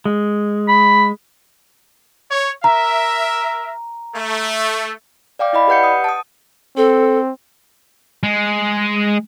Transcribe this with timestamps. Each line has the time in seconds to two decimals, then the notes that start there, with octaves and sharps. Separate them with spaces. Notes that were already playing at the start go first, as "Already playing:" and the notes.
0.05 G#3
0.68 B5
2.30 C#5
2.64 A#4 E5 A#5
4.16 A3
5.39 D5 F5 G5 D6
5.53 E4 D5 D#5 B5
5.68 G4 B4 F#5 G6 C#7
5.84 D#6
6.04 A5 D#6
6.77 C4 A4
8.23 G#3